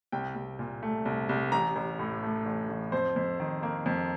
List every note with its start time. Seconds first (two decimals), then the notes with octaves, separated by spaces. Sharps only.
0.12 C2 G5
0.36 C2
0.59 A#2
0.83 A3
1.05 C2
1.29 C2
1.52 A1 A#5
1.76 A1
1.99 A2
2.23 A3
2.45 A1
2.69 A1
2.92 F2 C5
3.16 F2
3.40 D#3
3.63 A#3
3.86 F2